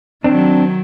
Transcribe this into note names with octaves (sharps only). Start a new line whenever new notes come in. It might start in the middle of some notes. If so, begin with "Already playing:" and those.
D#3 F#3 C4 D4